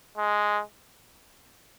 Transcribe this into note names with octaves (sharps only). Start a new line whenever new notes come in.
G#3